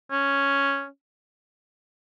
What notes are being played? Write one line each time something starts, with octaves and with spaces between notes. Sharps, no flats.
C#4